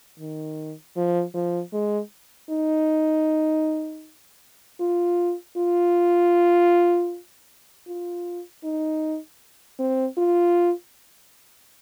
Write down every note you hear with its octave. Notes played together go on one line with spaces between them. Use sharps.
D#3
F3
F3
G#3
D#4
F4
F4
F4
D#4
C4
F4